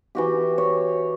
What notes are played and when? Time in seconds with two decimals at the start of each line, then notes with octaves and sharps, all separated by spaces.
0.15 E3 F#4 G4
0.58 C#5